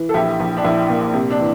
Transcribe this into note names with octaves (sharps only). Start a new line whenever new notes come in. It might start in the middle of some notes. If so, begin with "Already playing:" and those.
Already playing: E3
A4
A#1 E4 G4
A#1
D4
A#1 E4
A#2
C3
D4
E3